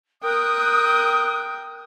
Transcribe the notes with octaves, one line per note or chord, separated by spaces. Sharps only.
A#4 G5 D#6 F#6